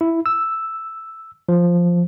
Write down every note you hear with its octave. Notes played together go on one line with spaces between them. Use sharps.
E4
E6
F3